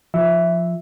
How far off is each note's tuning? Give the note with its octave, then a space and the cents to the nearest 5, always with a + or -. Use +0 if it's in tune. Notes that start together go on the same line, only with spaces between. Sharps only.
F3 +0 E5 +0